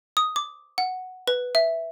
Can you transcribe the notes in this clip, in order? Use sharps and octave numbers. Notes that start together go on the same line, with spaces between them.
D#6
D6
F#5
B4
E5